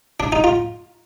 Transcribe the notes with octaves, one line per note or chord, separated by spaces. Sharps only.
D4
D#4
F4